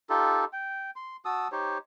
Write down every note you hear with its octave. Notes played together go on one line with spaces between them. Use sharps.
D#4 F4 G4 A4
G5
C6
F#4 A5 D#6 E6
D#4 G4 C5 C#5